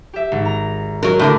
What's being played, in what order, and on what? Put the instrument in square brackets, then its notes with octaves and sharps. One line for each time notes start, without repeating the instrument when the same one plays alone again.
[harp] G4 E5
G#1
A#5
[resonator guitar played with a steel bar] F#3 A#4
A2 D3 A#4